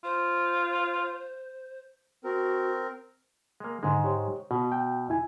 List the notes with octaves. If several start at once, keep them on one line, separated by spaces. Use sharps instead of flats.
F4 C5
C4 F#4 A#4
G#3 A#3
G#2 D3 D#3 G#3
G4 C5 C#5
B2 F#4
G5
E2 E4 G#5